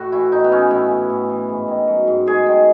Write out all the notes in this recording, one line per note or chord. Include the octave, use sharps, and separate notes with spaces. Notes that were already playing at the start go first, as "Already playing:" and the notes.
Already playing: A2 F#4
E3 E4
A2 D#4
B3
E3 C#4
A2 E4
E3
A2
E3
G#2
D#3
F#3
G#2
G#2 G#4
D#3